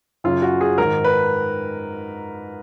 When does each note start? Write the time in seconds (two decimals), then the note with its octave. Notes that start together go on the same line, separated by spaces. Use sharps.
0.24 F#2 C#3 F4
0.42 F#4
0.61 G#4
0.78 G#2 D#3 A#4
1.04 B4